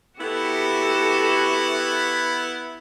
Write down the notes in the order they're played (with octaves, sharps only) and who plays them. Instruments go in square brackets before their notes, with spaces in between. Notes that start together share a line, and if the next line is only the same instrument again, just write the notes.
[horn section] B3 E4 [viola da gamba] F#4 G4 A4